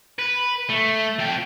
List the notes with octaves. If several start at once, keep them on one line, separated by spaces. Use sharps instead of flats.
B4
A3
F3 G5